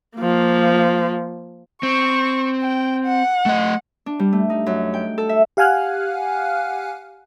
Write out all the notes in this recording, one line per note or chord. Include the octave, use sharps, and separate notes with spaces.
F3 A#3
C4 C#6
G5
F#5
A3 D#5
D4
G3
A3
D#4
F#2
G5
A4
E5
G4 F5 F#5 G#5 F6 F#6